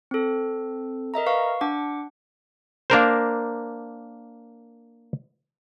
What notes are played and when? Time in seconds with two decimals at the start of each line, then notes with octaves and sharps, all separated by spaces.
0.11 C4 A4
1.14 A#4 D#5 E5 A#5
1.26 B4 F5 C#6
1.61 D4 F#5 D6
2.90 A#3 D4 A#4 C5